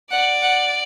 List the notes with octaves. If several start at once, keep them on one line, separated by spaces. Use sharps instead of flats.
D5 F#5
F#5